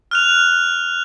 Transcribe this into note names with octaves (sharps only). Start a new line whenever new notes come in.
F6 F#6 F7